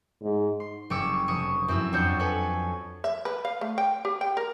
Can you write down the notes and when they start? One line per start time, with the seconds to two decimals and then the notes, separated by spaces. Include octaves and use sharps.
0.22 G#2
0.60 C6
0.90 F#1 G3 C#4 C#6 D6 E6
1.28 F1 C#6 D#6
1.68 F#2 C4 E4 E6
1.93 F2 D4 F#4 C#5 G6
2.19 A4 B4 C#5 G#5
3.04 E5
3.25 B4
3.45 F5
3.61 A3
3.78 G5
4.05 G4
4.21 G5
4.37 A#4